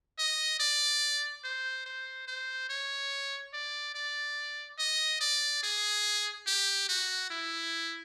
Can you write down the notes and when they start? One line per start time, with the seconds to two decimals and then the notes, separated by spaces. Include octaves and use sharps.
0.19 D#5
0.60 D5
1.44 C5
1.86 C5
2.28 C5
2.69 C#5
3.54 D5
3.95 D5
4.79 D#5
5.21 D5
5.63 G#4
6.47 G4
6.89 F#4
7.31 E4